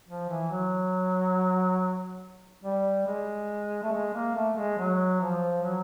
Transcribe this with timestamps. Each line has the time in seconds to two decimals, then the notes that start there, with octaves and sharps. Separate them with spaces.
0.08 F3
0.29 E3
0.51 F#3
2.64 G3
3.07 G#3
3.82 A3
3.92 G#3
4.14 A#3
4.35 A3
4.57 G#3
4.78 F#3
5.20 F3
5.63 F#3